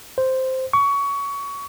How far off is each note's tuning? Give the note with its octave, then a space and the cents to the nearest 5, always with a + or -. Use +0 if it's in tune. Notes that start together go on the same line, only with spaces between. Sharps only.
C5 -5
C#6 +20